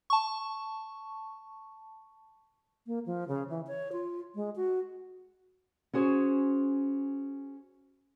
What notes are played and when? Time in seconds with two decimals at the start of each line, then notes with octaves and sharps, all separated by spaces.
0.10 A5 C#6
2.87 A#3
3.06 F3
3.28 C#3
3.50 E3
3.67 C#5
3.92 F4
4.35 G#3
4.56 F#4
5.93 C#4 F#4 G#4 C5